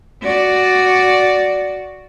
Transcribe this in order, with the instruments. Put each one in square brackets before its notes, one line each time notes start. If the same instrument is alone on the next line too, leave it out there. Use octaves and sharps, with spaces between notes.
[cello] F#4 D5